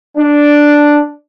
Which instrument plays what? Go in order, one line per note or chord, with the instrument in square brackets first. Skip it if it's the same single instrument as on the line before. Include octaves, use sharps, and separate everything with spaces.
[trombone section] D4